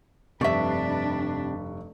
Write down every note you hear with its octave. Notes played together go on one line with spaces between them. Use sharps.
F1 G2 C3 D4 B4 D5 E5 C#6